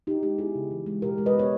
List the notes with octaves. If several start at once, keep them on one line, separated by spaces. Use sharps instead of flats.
D#3 D#4 G4
G#3 D#4 G4
B3 E4 G#4
C#3
E3
G#3
B2 G4 A#4
G#3
B4 D#5
B3 C#5